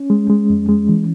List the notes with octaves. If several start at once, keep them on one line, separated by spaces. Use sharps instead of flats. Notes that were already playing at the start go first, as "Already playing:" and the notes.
Already playing: C#4
G#3
G#3
F2
G#3
E3